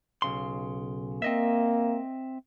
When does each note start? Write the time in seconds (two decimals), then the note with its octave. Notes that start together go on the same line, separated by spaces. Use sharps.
0.22 B1 C#3 C6
1.22 A#3 C4 D#5 E5